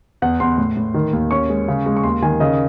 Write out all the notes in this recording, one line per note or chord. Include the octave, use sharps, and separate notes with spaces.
E2 F#5
E2 C6
A2
A2
D#3
D#2
C#4 C#6
G#3
C#3
G#3
C#6
D#2 C6
D#3 G#5
C#3 D#5